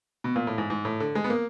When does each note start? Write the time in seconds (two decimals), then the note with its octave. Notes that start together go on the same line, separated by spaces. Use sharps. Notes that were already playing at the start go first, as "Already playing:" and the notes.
0.24 B2
0.36 A#2
0.47 A2
0.58 G#2
0.70 G#2
0.85 A2
1.00 D3
1.15 G#3
1.24 B3
1.30 A#3